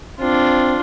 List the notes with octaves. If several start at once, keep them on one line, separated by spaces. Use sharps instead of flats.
C4 D4 F4